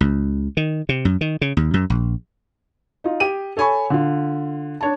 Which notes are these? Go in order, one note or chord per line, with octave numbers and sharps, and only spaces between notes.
C#2
D#3
C3
F#2
D#3
C#3
D#2
F#2
A#1
D#4 F4
G4 D#7
A4 C#5 G#5 B5 C#6
D3 F4
D4 C#5 A5